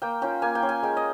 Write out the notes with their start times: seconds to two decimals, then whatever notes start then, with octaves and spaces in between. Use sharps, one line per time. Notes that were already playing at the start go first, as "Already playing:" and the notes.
0.02 A#3 G5
0.22 C#4 F4 G5
0.42 A#3 G#5
0.55 G5
0.62 C#4 F4
0.69 G#5
0.83 G#3 G5
0.97 D#5